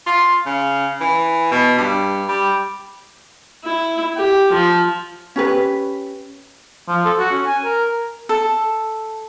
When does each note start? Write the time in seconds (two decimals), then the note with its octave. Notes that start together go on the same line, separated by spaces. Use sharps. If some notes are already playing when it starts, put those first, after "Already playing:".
0.06 F4
0.46 C#3
1.01 E3
1.51 B2
1.78 G2
2.28 G3
3.64 E4
4.17 G4
4.53 F3
5.36 C#4 G4 B4
6.88 F3
7.05 A4
7.18 F#4
7.32 C#4
7.45 G#5
7.64 A#4
8.29 A4